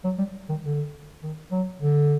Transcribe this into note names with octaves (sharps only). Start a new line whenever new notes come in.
F#3
G3
D#3
D3
D#3
F#3
D3